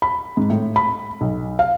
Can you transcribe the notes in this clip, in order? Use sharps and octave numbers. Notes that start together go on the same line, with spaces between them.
B5
G#2
A2
B5
B1
F5